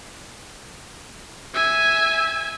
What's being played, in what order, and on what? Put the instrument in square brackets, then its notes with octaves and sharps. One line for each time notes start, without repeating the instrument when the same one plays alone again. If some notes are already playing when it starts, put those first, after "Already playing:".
[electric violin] E5 G#5